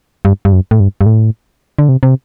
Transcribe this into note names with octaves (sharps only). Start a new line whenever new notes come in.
G2
G2
F#2
A2
G2
G2
A2
D3
C3
C3